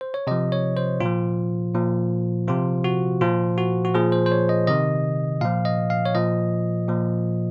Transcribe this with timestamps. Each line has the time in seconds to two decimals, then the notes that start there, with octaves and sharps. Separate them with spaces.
0.01 C5
0.14 C#5
0.27 C3 F3 D#5
0.52 C#5
0.77 C5
1.00 A#2 F3 F4
1.75 A#2 F3
2.48 C3 F3 F4
2.84 F#4
3.21 A#2 F3 F4
3.58 F#4
3.85 F#4
3.94 A#2 F3 G#4
4.12 C5
4.26 C5
4.32 C#5
4.49 D#5
4.67 C3 D#3 D#5
5.41 A#2 F3 F5
5.65 D#5
5.90 F5
6.06 C#5
6.15 A#2 F3 D#5
6.88 A#2 F3